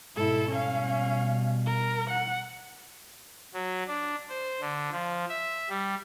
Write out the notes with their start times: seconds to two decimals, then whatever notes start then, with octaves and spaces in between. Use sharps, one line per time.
0.16 G#2 B2 E4 A4
0.51 B2 G3 C#4 F5
1.66 A#4
2.10 F#5
3.54 F#3
3.87 D4
4.29 C5
4.61 D3
4.92 F3
5.29 E5
5.69 G3